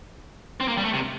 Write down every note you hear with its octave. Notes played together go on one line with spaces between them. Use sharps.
C4
A#3
G3
A3
C3